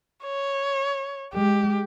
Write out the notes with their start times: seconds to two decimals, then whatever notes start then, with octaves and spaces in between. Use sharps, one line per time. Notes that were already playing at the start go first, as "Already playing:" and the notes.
0.24 C#5
1.34 G#3 G4